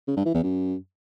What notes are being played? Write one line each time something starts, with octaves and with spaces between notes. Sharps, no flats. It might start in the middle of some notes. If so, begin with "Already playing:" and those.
C#3
G2
E3
E2
F#2